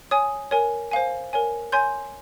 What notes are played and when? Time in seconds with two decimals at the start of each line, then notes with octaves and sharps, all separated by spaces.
0.11 C#5 G#5 D#6
0.51 A#4 C#5 G#5
0.91 C5 F5 G#5
1.33 A#4 C#5 G#5
1.72 C#5 G#5 C6 G6